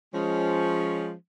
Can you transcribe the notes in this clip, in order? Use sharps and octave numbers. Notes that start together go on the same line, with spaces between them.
F3 G#3 C#4